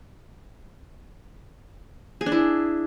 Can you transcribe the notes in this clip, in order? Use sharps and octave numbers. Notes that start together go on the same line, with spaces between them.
G#4
D4
E4